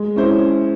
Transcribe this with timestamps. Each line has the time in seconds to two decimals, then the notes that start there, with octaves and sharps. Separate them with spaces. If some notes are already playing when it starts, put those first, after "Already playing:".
Already playing: G#3
0.16 C#4 E4 C5